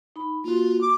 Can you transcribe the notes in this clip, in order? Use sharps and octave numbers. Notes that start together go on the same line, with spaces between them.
D#4 B5
A#3 F4 F#4
D6